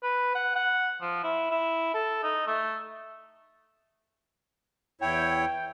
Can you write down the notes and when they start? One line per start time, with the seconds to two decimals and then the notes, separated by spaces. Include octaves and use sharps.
0.02 B4
0.34 F#5
0.55 F#5
1.01 F3
1.23 E4
1.51 E4
1.94 A4
2.23 D#4
2.47 A3
5.01 E2 E4 C#5 G5